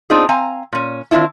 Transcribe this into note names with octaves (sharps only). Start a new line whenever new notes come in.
B3 C4 D4 D#4 F4 G#4
C4 F5 G#5 A#5
A#2 C#4
D#3 C4 D4 E4 F4